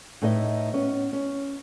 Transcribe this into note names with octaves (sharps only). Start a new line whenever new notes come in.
A2 D#4 B4 D#5 E5
B3 C#4
C#4